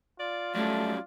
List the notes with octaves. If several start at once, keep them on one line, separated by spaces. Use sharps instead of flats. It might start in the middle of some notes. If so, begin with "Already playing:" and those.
F4 D5
F#3 G3 A3 C#4 D5